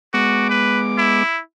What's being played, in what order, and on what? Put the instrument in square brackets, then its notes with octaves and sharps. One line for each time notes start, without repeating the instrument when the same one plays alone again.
[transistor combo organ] G#3 B3 D6 [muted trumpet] F#4
[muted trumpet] B4
E4